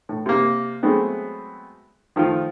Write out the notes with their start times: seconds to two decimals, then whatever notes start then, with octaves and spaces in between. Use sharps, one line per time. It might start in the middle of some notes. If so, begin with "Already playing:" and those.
0.09 A2
0.26 C3 A#3
0.83 F#3 G#3 A3 B3 C4
2.16 D#3 F3 A3 F4